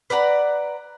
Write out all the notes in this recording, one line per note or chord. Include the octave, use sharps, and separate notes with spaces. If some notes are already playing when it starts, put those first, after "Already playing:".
B4 D5 F#5 A#5